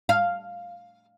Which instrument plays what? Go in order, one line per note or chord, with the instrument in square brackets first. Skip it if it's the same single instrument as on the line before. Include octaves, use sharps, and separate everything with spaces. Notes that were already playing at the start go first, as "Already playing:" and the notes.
[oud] F5